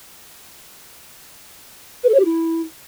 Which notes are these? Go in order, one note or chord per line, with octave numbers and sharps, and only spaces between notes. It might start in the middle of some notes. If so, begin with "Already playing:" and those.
B4
A4
C#5
G4
E4